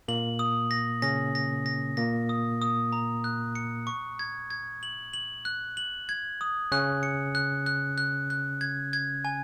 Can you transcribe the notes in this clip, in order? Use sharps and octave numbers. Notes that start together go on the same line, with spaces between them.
A#2 A#3 F#7
D#6
A#6
C#3 C#4 A#6
A#6
A#6
A#2 A#3 A#6
D#6
D#6
A#5
F#6
C#7
C#6
G#6
G#6
F#7
F#7
F#6
F#7
G#6
D#6
C#3 C#4 F#6
C#7
F#6
F#6
F#6
F#6
G#6
G#6
G#5